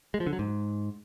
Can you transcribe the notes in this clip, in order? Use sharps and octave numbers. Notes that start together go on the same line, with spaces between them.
G#3
F3
D3
F#3
G#2